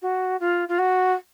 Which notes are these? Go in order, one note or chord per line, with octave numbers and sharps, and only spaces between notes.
F#4
F4
F4
F#4